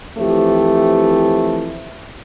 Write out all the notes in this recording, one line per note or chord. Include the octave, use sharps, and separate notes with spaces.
E3 F3 A3 C4 G4